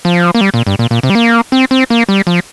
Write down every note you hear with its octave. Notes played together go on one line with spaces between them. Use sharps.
F3
A#3
G3
A#2
G2
A#2
A#2
C3
G3
A#3
C4
C4
A#3
G3
F3